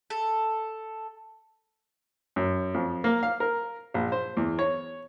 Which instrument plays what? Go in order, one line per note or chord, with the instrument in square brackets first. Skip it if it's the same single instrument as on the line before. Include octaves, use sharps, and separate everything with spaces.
[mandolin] A4
[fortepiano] F#2
F2
A#3
F5
A#4
A#1
C5
E2
C#5